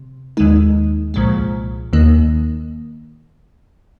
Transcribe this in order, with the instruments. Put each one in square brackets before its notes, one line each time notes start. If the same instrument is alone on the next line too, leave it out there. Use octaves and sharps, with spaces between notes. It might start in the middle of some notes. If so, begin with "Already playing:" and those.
Already playing: [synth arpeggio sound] C3
D#2 D#3 G#3 D#4
C2 A#2 F3 G#3
D#2 D#3 A#3